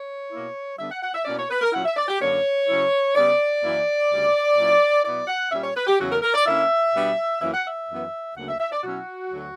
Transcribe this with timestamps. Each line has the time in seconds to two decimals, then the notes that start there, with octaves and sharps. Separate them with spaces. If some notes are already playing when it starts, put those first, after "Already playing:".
Already playing: C#5
0.31 B2 A#3 E4
0.78 D3 G3 B3 D4 E5
0.90 F#5
1.02 F#5
1.13 E5
1.25 B2 A#3 C#4 E4 D5
1.37 C#5
1.50 B4
1.61 A#4
1.72 A#2 F#3 C#4 E4 F#5
1.85 E5
1.96 D5
2.08 G4
2.20 F#2 D3 A#3 D4 C#5
2.67 C#3 F#3 C#4 E4
3.15 C#3 G3 B3 D5
3.62 F#2 E3 A#3 E4
4.10 D2 C#3 G3
4.57 A#2 F#3 C#4 E4
5.04 B2 F#3 B3 E4 D5
5.27 F#5
5.51 A#2 G3 C#4 E5
5.63 C#5
5.75 B4
5.87 G4
5.99 E2 C#3 F#3 C#4 F#4
6.11 A#4
6.22 A#4
6.34 D5
6.46 D3 A#3 C#4 E4 E5
6.94 B2 G3 B3 D4
7.41 F#2 E3 A#3 C#4 E4 E5
7.53 F#5
7.65 E5
7.89 F#2 E3 B3
8.36 D2 C#3 F#3 A#3 F#5
8.47 E5
8.59 E5
8.71 D5
8.83 B2 F#3 C#4 E4 F#4
9.30 D2 D3 F#3